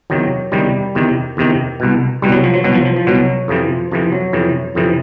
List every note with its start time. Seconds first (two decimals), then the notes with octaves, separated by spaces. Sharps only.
0.10 E2 C3 D#3 F#3
0.52 E2 C3 D#3 G3
0.95 E2 C3 D#3
1.37 E2 C3 D#3
1.80 C2 B2
2.22 C2 B2 G3
2.32 F#3
2.44 F3
2.54 F#3
2.64 C2 B2 F#3
2.74 F3
2.85 F3
2.96 F3
3.07 C2 B2 F#3
3.48 F2 C3 E3 F3
3.91 F2 C3 E3 F3
4.12 F#3
4.33 F2 C3 E3
4.75 F2 C3 E3